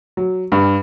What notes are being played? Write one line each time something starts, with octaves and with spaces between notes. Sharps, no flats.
F#3
G2